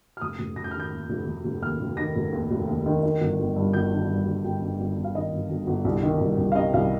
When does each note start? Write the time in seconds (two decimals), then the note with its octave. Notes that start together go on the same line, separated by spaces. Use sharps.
0.17 F6
0.21 F1 D#6
0.39 F1
0.56 F1 A#6
0.64 G6
0.71 F6
0.74 D#3
0.80 G6
0.92 D#2
1.10 F1
1.27 F1
1.44 F1
1.62 D#2 F6
1.80 F1
1.97 D#3 A#6
2.16 F1
2.33 D#2
2.51 F1
2.67 D#2
2.86 D#3
3.03 D#3
3.21 G1
3.39 G1
3.56 G2
3.73 G1 G6
3.91 D#3
4.09 G2
4.26 G1
4.44 G1 G5
4.61 G1
4.80 G1
4.97 G1
5.04 F5
5.14 D#3 D#5
5.33 G1
5.49 G1
5.67 G1
5.85 C2
6.03 D#3
6.21 C2
6.38 C2
6.52 F5
6.56 C3 D#5
6.74 C2 F5